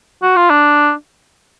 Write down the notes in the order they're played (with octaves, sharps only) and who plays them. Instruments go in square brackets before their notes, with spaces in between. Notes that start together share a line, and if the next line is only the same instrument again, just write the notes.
[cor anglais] F#4
F4
D4